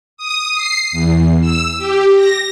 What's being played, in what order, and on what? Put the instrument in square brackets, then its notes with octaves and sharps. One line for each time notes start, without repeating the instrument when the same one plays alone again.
[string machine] D#6
C7
E2
E6
G4
A#6